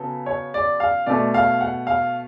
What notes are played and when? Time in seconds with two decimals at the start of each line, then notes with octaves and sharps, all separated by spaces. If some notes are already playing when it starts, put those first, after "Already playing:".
Already playing: C#3 F#3 B3 A4
0.26 C#5
0.54 D5
0.80 F5
1.06 B2 A3 D5
1.34 F5
1.61 F#5
1.87 F5